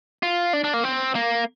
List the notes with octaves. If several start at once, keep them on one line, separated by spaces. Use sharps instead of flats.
F4
D4
D4
A#3
C4
A#3